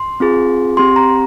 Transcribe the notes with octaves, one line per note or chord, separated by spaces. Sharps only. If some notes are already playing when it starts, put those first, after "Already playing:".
Already playing: C6
C4 F4 G#4
C4 G4 C6
A#5